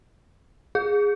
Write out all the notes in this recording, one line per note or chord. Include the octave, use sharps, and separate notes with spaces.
G#4